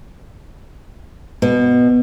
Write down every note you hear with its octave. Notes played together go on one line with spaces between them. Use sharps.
B2